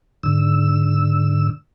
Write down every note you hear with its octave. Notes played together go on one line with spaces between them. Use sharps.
G#2 D3 E6